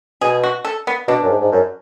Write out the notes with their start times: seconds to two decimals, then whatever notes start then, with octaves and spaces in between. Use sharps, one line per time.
0.21 B2 G#4
0.44 F#4
0.65 A4
0.87 B3
1.08 B2 D4
1.23 F#2
1.29 G#2
1.41 G#2
1.52 F#2